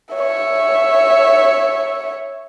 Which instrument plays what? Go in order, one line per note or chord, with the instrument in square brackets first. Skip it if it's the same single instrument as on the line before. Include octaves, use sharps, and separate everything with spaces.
[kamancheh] C#5 E5